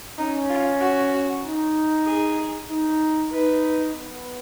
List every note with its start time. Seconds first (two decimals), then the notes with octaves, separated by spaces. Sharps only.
0.18 C#4 D#4
0.49 F4
0.81 F#4
1.43 D#4
2.06 G#4
2.69 D#4
3.31 D#4 B4
3.94 B3